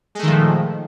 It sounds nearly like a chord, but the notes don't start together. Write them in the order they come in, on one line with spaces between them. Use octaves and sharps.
G#3 A3 D#3 F3 A#2